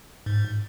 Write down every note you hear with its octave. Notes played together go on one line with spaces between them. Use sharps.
G#2